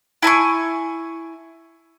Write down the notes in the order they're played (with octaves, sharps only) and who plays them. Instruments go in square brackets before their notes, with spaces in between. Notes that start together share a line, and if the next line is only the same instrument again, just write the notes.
[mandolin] E4 G#5 A#5 C#6